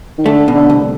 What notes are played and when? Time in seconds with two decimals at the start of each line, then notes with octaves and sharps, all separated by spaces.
0.18 D#3
0.25 D3 A3
0.48 B2
0.55 D3
0.70 C2